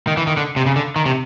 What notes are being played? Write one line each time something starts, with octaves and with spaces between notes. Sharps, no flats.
D#3
E3
D#3
D3
C3
C#3
D3
D#3
C3